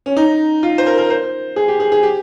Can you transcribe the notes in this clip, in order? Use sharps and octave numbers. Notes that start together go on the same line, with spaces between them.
C#4
D#4
F4
C5
A#4
A#4
C5
G#4
G4
G#4
G#4
G4